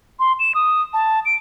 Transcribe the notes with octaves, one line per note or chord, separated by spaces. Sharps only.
C6
E7
D#6
A5
D7